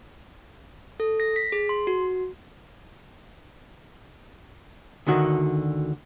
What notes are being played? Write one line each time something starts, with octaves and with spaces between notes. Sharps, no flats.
A4
A#6
B6
G#4
C6
F#4
D2 D3 D#3 F#4